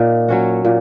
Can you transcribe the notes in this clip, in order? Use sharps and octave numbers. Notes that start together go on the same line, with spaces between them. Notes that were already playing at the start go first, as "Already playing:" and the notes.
Already playing: A#2 D#4
F#3 C#4 F#4
A#2